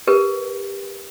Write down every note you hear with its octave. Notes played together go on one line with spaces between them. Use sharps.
G4 A#4 B4